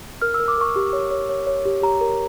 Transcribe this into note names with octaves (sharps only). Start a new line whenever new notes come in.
A#4 F6
E6
A#4
D6
A#4 C#6
G4
C#5
C#5
C#5
C#5
G4
G4 A#5
A#4